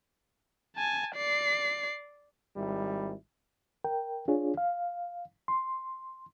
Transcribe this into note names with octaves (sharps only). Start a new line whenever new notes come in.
G#5 A5
D5 C7
G#1 G3 E4
A#4 G5
D4 F4 G#4 C#5
F5
C6